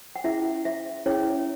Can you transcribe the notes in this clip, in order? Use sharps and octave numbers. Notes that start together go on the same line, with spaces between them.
F#5
C#4 E4 G#4 E5
E5
C#4 E4 G#4 C#5